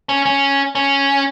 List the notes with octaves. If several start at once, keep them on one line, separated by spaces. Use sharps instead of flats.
C#4
C#4
C#4